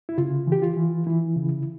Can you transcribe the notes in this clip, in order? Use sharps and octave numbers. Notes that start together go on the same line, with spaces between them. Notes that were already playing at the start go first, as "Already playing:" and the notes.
E4
C#3 F4
E3
G4
F4
E3
E3 E4
C#3